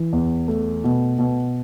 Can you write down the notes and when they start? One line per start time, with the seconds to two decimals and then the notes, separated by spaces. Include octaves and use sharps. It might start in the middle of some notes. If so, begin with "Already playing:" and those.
Already playing: E3
0.13 E2
0.48 A3
0.84 B2
1.19 B2